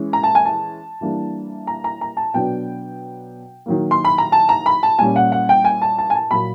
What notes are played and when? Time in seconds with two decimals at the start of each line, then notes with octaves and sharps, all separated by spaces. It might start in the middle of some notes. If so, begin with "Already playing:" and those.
Already playing: E3 G#3 C#4
0.13 A#5
0.23 A5
0.35 G#5
0.45 A5
1.01 E3 G3 A#3 D4
1.67 A#5
1.84 A#5
2.01 A#5
2.17 A5
2.34 B2 F#3 B3 D4 G5
3.66 D#3 F#3 A#3
3.91 C6
4.05 B5
4.18 A#5
4.32 A5
4.49 A#5
4.66 B5
4.83 A5
4.99 A#2 G3 A#3 C#4 G#5
5.16 F#5
5.32 F#5
5.49 G5
5.64 G#5
5.82 A5
5.98 A5
6.10 G#5
6.15 A5
6.31 A#2 F#3 A#3 B5